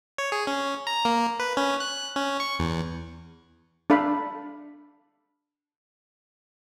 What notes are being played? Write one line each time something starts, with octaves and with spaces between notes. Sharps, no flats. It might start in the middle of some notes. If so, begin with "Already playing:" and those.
C#5
G#4
C#4
A#5
A#3
B4
C#4
F#6
C#4
C#6
E2
D4 A4 F5 B5